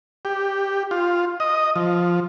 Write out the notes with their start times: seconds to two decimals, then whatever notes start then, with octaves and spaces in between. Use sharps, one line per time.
0.25 G4
0.91 F4
1.40 D#5
1.76 F3